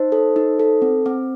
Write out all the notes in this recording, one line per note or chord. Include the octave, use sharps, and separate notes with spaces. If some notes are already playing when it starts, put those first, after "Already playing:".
Already playing: D#4 C5
A4
D#4
A4
C4
C4